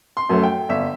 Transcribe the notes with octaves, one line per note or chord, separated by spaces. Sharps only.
C6
F#2 F#3 A3
G5
G1 E5